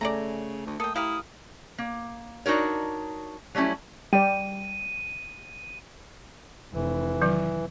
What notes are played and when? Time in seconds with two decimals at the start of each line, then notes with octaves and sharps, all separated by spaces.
0.01 C#3 A3 D5 G#5 A#5
0.67 D2
0.80 A#3 A4 G5 D#6
0.96 E4 G4 A#4 F5 D#6
1.78 A#3
2.46 D4 D#4 F#4 A#4 C#5
3.55 F#3 G3 A3 C#4 E4
4.13 G3 D5 G5 D#7
6.74 F1 E3
7.22 D#3 F#3